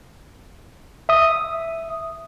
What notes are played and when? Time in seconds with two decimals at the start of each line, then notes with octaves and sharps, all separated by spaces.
1.09 E5 D#6